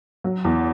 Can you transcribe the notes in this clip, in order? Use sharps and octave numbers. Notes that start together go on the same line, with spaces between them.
F#3
E2